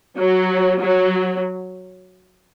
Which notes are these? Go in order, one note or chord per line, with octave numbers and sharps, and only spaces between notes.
F#3
F#3